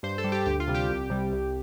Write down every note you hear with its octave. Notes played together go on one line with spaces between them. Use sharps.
G2 C5
A4
G3
G4
D2 G4
F4
C3 G3
G4
C2
C3 G3
C2